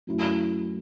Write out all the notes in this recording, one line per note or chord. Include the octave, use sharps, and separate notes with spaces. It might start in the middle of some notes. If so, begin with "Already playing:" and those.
F#2 F#3 A3 E4